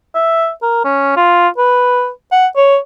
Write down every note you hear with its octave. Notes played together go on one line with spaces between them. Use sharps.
E5
A#4
C#4
F4
B4
F#5
C#5